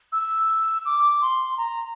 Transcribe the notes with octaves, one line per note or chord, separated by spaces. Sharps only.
E6
D6
C6
A#5